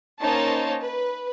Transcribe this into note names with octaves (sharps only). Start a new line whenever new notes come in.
A#3 C#4 D#4 C5 C#5 A5
B4